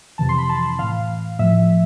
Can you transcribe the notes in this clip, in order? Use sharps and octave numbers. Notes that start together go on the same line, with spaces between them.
F2 C3 E3 A5
C6
B5
A5
A2 E3 F5
A2 F3 E5